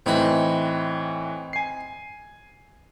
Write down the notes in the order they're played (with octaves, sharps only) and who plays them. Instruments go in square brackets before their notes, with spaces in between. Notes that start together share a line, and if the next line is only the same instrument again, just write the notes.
[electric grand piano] A2 E3 [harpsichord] C4 D#4 B5
[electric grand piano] G#5 C7